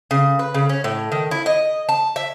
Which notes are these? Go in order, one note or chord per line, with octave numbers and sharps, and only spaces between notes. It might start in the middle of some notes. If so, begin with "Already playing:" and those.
C#3
B4
C#3
C#4
A2
D#3
E4
D#5
A5
E5